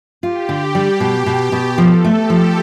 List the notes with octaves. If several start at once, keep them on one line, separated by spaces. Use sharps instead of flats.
F4 G4
D3
G3
B2
B2
B2
F3 A4
A3
G4
F3